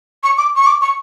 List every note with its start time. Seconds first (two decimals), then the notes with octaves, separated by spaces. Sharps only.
0.24 C#6
0.38 D6
0.56 C#6
0.66 D6
0.81 C#6